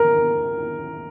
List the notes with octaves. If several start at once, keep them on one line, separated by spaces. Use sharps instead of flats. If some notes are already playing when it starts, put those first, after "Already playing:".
Already playing: A#4